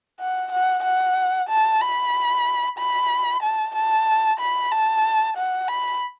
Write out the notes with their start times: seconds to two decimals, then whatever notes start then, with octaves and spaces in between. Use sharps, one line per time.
0.19 F#5
0.52 F#5
0.84 F#5
1.49 A5
1.81 B5
2.78 B5
3.42 A5
3.75 A5
4.40 B5
4.71 A5
5.37 F#5
5.68 B5